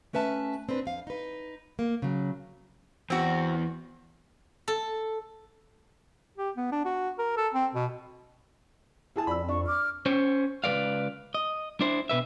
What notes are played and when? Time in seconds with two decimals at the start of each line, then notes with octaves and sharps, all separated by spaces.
0.13 A3 C#4 B4 E5 A5
0.69 C4 D4 B4
0.85 F2 F5
1.07 D#4 B4
1.79 A#3
2.02 C#3 F#3
3.10 E2 C4 F#4
4.68 A4
6.38 G4
6.57 B3
6.72 D4
6.85 F#4
7.18 A#4
7.37 A4
7.54 C4
7.75 B2
9.16 E4 G#4 A5
9.27 F2 D5 B5 E6
9.49 D4 C#6
9.67 D6 F6
10.06 C#4 C5 C#5
10.64 C#2 F#3 B4 D5 F5
11.34 D#5
11.81 D4 E4 C5
12.09 B2 B4 E5